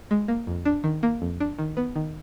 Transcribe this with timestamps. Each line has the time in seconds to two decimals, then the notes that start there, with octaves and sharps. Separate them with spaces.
0.11 G#3
0.28 A#3
0.47 F2
0.65 D4
0.84 D#3
1.03 A#3
1.22 F2
1.40 D4
1.58 D#3
1.77 B3
1.96 D#3